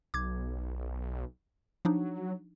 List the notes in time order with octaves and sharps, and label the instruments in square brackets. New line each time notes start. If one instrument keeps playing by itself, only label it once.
[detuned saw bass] B1 [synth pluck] D6 G#6
[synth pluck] F3 D4 D#4 [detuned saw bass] F#3